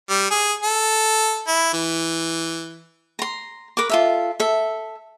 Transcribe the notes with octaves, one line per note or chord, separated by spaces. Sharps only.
G3
G#4
A4
E4
E3
A#5 C6
A#4 B4 D6
F4 A4 E5
A4 E5